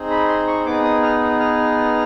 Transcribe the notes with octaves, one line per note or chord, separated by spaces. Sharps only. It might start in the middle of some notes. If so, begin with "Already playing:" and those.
Already playing: C4 D#4 G#4
B5
C6
C#6
B3 D#4 G#4 D6
D#6
F6
F6